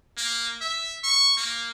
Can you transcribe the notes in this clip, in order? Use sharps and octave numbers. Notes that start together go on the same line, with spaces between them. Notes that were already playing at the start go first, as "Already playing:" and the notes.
A#3
E5
C#6
A#3